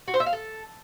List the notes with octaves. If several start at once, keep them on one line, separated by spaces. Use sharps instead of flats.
F#4
C5
E5
F5
A4